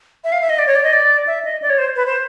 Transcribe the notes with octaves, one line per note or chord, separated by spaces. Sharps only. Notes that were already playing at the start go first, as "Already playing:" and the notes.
E5
F5
E5
D#5
D5
C#5
D5
D#5
D5
E5
D#5
D5
C#5
C5
B4
C5